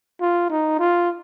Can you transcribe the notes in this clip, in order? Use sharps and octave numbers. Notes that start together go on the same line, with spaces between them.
F4
D#4
F4